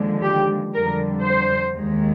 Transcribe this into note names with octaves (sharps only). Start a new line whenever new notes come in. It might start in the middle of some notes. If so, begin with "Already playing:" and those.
Already playing: D#2 D3 F3 G#3
G4
F2 D3 G3 A#4
C5
D#2 D#3 G#3